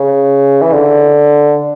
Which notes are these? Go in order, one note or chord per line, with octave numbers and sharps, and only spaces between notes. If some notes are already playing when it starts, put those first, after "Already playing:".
Already playing: C#3
E3
D3